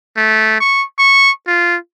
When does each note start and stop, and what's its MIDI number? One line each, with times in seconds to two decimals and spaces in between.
0.17 0.60 57
0.60 0.84 85
0.99 1.31 85
1.47 1.77 65